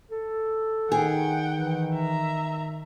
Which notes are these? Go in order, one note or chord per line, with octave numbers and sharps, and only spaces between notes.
A4
D#3 G#4 F#5 G5
E3
E5 A#5